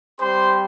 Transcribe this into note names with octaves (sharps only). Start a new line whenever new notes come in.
G3 C4 G4 C5 C6